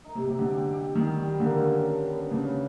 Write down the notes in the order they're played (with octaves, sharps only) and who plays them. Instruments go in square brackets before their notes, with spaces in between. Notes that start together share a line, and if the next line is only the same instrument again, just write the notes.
[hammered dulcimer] D#4
[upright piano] C3
[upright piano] C3 [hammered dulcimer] G4
[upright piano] D3
[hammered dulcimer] G4
G4
[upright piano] D#3 [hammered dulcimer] G3
[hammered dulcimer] G3
[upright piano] D3 [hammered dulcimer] A#3
[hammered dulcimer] C#4
D4
B3
[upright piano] C#3 [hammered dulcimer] D4